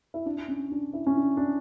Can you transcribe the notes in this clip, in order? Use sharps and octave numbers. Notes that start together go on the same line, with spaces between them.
E4
D4
C#4
D4
E4
C#4
D4
D4